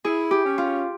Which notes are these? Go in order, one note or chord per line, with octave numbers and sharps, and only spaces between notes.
E4 G#4
G4
C#4
F4